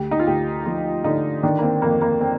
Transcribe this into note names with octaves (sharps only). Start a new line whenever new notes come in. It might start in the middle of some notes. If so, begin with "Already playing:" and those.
Already playing: D2 G4
D#4
F4
D2 G4
F3 F4
D3 D#4
D#3 D4
A#3
C4
F2 A#3
A#3
C4